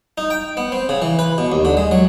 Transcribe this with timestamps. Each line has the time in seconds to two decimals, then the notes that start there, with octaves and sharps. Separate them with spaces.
0.18 D#4
0.30 G5
0.57 B3
0.72 C4
0.89 C#3
1.02 E3
1.19 B4
1.38 B2
1.52 D#2
1.65 D3
1.77 G#3
1.91 F#3